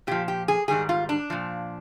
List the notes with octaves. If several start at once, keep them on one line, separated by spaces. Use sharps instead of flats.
A#2 F3 G4
G4
G#4
G#2 D#3 G3 G#4
F4
D4
A#2 F3